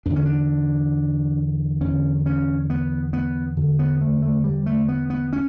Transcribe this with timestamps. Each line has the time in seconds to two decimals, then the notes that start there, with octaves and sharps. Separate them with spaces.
0.06 E2 D3 D4
0.16 C#4
0.25 D4
1.81 E2 D3 C#4
2.26 C#4
2.70 B3
3.13 B3
3.57 E2 D3
3.79 B3
4.01 A3
4.22 A3
4.44 G3
4.66 A3
4.88 B3
5.10 B3
5.33 C#4